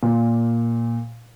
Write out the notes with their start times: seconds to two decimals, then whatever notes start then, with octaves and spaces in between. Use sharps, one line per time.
0.03 A#2